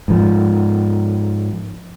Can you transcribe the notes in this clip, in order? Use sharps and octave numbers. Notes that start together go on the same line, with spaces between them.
G#2 F3